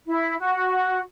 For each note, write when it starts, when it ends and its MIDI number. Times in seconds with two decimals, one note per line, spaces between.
0.08 0.36 64
0.39 1.00 66